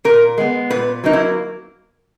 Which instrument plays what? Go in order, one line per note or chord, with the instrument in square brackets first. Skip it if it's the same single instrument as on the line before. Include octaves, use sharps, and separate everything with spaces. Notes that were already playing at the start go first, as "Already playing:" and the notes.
[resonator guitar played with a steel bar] A#2 A#4
G#3 B3
A#2 B4
F#3 A#3 D#4
E4